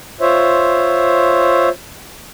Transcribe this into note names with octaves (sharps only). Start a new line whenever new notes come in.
F4 C5 C#5 E5